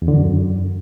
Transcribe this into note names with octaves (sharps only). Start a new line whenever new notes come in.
E2
D3
F#2